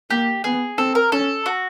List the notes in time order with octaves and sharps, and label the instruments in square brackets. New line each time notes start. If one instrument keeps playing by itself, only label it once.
[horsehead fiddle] A#3 [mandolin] G4
[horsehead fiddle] B3 [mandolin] G#4
[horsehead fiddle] C4 [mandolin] A4
[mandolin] A#4
[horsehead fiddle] C#4 [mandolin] A4
[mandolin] F#4